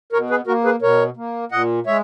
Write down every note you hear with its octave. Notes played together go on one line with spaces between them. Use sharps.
B2 A#4 C#5
G#4 B4
A#3 F#4 A#4
G#4 B4
B2 A#4 C#5
A#3
A#2 D#5 F#5
G#3 C#5 E5